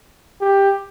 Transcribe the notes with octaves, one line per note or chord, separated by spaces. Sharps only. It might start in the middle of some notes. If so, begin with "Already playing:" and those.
G4